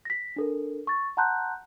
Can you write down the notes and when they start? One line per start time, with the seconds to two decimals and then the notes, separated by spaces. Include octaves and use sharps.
0.05 A#6 B6
0.36 D4 A4 A#4
0.87 C#6 A6
1.17 F#5 A5 A#5 C6 F#6 G6